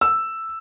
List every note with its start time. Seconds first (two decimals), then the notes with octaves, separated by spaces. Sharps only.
0.01 E6